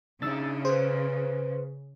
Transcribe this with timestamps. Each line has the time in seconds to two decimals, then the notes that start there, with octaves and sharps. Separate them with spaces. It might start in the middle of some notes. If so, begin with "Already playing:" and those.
0.22 C#3 D4 D#4 E5 E6 A6
0.65 G#4 B4 C5